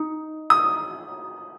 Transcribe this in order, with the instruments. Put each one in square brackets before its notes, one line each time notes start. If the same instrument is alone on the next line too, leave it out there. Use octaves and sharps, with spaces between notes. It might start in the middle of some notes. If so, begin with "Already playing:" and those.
Already playing: [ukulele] D#4
[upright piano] D#6